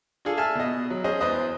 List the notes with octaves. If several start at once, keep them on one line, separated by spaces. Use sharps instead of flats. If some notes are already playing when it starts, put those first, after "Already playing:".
D4 F4 G#4 A4
E5 G#5 A5 E6 F6
B2 D#5
F#3
C#4 G#4 C5 D#5
E2 B4 C5 D#5 D#6